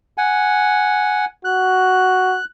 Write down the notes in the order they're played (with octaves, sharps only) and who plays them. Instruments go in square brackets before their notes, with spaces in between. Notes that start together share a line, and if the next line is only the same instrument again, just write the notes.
[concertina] F#5 G#5
[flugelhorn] F#4 [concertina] F#6